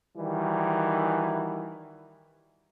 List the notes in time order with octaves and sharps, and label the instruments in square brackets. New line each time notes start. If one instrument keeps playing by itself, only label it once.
[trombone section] D#3 E3 G3 F#4